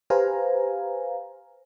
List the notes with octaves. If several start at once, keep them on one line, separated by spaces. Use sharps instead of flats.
G4 B4 C5 F5 G#5 A#5